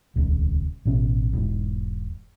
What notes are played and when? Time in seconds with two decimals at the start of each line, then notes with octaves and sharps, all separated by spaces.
0.16 D#1 C#2 C#3
0.85 A1 B2 C#4
1.33 E1 G#2